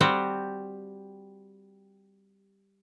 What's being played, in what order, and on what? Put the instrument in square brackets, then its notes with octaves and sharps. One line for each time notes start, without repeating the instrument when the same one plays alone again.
[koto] G3 C4 F#4 G4